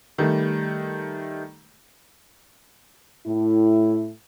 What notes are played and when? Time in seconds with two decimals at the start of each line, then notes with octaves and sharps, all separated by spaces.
0.18 D#3 G3 A3
3.27 A2 E4